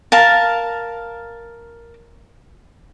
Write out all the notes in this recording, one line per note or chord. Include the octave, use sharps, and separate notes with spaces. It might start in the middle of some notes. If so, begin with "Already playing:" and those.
A#4 F5 A5